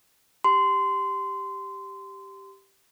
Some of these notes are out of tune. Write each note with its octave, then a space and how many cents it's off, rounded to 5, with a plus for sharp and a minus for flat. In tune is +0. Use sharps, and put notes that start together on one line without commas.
G4 +0 C6 -20